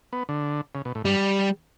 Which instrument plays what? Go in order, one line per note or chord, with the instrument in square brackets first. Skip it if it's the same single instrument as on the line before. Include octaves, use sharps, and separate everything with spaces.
[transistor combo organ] B3
D3
C#3
B2
A2
[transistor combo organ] G2 [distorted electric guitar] G3